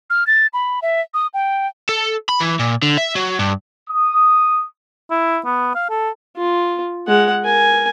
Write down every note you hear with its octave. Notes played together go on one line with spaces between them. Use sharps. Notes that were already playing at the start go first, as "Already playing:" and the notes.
F6
A6
B5
E5
D#6
G5
A4
B5
E3
A#2
D3
E5
F#3
G2
D#6
E4
B3
F5
A4
F4
G#3 F#5
A#4 G#5